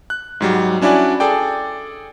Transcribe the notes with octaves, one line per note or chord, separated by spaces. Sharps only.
F#6
G#2 F#3 G3
C#4 D4 E4 F#4 D5 G#5
G#4 A4 D5 G5